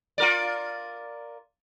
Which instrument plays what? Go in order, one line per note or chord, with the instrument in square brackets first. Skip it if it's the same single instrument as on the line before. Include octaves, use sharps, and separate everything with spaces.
[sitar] F4 A#4 D5